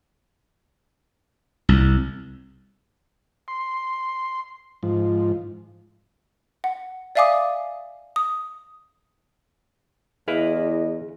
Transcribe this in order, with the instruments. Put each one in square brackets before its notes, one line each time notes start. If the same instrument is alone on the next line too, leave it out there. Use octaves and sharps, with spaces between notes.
[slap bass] C2
[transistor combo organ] C6
G#2 F3
[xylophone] F#5
D5 E5 F5 G#5 D6 D#6
D#6
[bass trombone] E2 [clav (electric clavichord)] E4 B4 F5 [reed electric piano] G#4 [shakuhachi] D#5